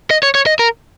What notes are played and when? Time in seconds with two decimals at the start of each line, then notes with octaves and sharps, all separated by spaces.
0.10 D#5
0.23 C#5
0.35 C#5
0.46 D#5
0.59 A#4